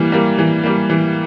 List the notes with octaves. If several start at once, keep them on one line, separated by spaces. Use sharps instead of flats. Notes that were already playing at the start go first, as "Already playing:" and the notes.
Already playing: E3 G3 A#3
G3 A#3
E3
G3 A#3
E3